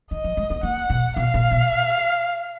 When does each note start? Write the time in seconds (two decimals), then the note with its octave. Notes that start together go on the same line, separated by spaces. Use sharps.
0.11 D#3 D#5
0.24 F3
0.37 G#3
0.50 B3
0.63 A#3 F#5
0.90 B2
1.16 B2 F5
1.34 A#2
1.51 B2